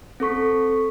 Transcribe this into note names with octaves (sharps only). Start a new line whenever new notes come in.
C4 A4 C#6 B6